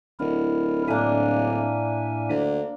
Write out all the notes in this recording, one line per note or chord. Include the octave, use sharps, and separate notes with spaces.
D1 E4 A#4
A2 A#3 D4 E5 G#5
D2